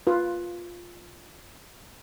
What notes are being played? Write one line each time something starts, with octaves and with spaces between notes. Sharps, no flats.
F4 B4